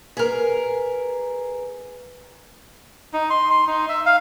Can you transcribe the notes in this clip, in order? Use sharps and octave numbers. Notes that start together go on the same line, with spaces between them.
G#4 A#4 B4 G#5
D#4
C6
C6
D#4
E5
F5